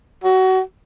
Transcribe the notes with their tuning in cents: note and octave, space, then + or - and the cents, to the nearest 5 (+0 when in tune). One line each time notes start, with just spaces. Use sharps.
F#4 +25